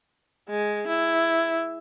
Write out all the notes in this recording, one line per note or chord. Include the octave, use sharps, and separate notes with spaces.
G#3
E4